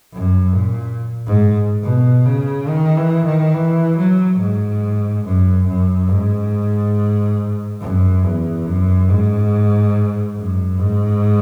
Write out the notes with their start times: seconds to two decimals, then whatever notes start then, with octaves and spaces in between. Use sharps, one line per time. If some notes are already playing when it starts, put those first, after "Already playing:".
0.13 F#2
0.55 A#2
1.27 G#2
1.84 B2
2.26 C#3
2.69 D#3
2.97 E3
3.26 D#3
3.54 E3
3.97 F#3
4.39 G#2
5.25 F#2
5.67 F#2
6.10 G#2
7.81 F#2
8.24 E2
8.66 F#2
9.09 G#2
10.37 F#2
10.80 G#2